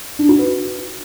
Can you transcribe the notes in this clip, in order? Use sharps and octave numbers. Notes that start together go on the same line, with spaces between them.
D4
F#4
B4